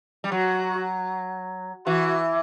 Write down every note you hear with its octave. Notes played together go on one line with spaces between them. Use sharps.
G3
F#3 F#4
E3 F#4